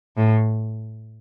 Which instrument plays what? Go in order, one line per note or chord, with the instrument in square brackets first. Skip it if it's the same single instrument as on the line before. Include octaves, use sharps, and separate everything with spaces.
[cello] A2